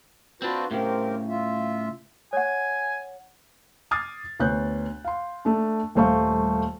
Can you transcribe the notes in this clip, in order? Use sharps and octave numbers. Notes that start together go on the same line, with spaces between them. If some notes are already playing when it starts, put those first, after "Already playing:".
C4 D4 F4 F#4 B4
A2 C#3 C4 G4 A#4
F4 E5
C#5 F#5 G#5
D6 D#6 F6 G#6 A6 C7
D2 B3 C#5 F#6 G6
F5 C6
A3 D4
D#1 G3 A3 C5 F5 C#6